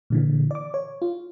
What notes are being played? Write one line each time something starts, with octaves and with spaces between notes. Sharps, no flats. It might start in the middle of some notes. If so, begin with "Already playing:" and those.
A#2 D3 E3
D5 D6
C#5
F4